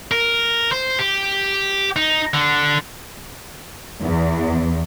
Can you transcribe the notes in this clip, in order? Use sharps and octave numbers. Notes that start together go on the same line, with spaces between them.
A#4
C5
G4
D#4
D3
E2